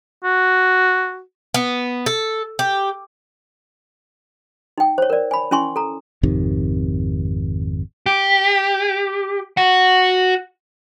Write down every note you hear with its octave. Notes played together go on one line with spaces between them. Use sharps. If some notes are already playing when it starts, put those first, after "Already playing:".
F#4
B3
A4
G4
D#4 G5
C5 C#5
A#4 D5
G#5 B5
C#4 E4 G#5 C6 C#6
A4 A#5
G#1 F2 C3 D#3
G4
F#4 F#5